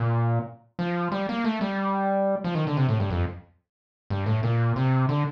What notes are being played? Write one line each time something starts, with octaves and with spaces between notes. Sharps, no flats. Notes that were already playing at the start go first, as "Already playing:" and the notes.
Already playing: A#2
F3
G3
A#3
A3
G3
F3
D#3
D3
C3
A2
G2
F2
G2
A2
A#2
C3
D3